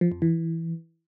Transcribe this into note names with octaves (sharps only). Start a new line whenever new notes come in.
F3
F2
E3